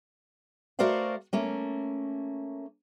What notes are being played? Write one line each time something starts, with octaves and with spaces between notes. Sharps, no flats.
A3 F#4 A#4 C5 D5 F5
A3 A#3 C#4